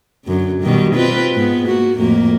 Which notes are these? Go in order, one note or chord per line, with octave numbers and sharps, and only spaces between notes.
F#2 D3
B2 D#3 G3
C4 F4 B4
G#2 B3
A#3 F#4
F2 A2 A#3